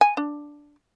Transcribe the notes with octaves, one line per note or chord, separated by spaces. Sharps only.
G#5
D4